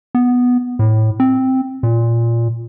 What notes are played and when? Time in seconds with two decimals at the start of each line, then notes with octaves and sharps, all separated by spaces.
0.15 B3
0.79 A2
1.20 C4
1.83 A#2